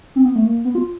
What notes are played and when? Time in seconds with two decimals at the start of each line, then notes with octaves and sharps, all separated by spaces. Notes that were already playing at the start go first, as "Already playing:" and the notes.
0.16 C4
0.25 B3
0.36 A3
0.45 A#3
0.65 B3
0.75 F4